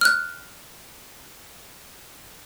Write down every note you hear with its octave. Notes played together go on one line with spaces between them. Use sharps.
F6 F#6